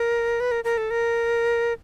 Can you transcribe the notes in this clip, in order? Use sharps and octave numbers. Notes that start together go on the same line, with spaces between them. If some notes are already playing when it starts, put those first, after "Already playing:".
Already playing: A#4
B4
A#4
A#4
A4
A#4